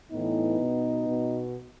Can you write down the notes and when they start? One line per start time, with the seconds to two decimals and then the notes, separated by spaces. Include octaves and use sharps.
0.12 A2 E3 B3 D#4
0.60 B2
1.08 B2